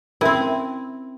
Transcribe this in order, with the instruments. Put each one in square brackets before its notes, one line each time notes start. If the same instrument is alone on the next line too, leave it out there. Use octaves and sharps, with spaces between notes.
[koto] C4 E4 [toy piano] C#4 A#4